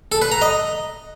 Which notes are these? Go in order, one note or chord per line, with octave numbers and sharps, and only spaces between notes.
A4
B4
A#5
D#5